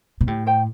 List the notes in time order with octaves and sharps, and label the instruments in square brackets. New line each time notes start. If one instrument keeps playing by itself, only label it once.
[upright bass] B2
[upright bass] A2 [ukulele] G4
[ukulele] C5 G5